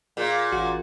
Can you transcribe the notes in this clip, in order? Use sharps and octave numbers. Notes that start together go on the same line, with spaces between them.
A#2 G#4 F5
A1 F4 F#4